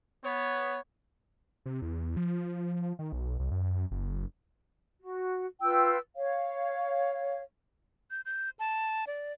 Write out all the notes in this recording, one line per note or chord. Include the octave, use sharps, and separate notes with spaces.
B3 C#5
C3
E2
F3
D#3
B1
C2
F#2
F#1
F#4
F4 B4 G5 E6
C#5 F5
G6
G6
A5
D5